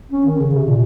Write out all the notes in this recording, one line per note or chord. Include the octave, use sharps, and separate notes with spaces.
C#4
D#3
C#3
C3
A#2